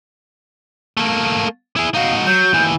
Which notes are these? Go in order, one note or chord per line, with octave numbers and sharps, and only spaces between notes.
A3 A#3
E4 G#4
D#4 F#4 F5
F#3 G6
D#2 E3